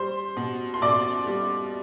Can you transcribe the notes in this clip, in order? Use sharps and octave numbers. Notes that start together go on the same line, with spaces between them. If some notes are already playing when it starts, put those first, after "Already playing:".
Already playing: G3 C5 C6
B2
C6
B2 D5 D6
G3